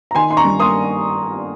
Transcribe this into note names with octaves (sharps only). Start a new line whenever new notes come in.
A#5
D#3 G#5 C6
D#4 C6
A#5 C#6
G2
A#3 C6 D#6